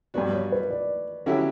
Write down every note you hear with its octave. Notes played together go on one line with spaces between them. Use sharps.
G2 F#3 B3 F#4 D5
C#5
B4
D5
D3 F#3 C#4 E4 G4